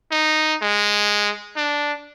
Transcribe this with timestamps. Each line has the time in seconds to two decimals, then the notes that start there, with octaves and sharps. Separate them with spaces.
0.12 D#4
0.62 G#3
1.57 D4